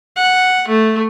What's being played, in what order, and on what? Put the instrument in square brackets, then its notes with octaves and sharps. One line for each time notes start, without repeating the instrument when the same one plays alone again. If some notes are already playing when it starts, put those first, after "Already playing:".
[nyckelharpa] F#5
A3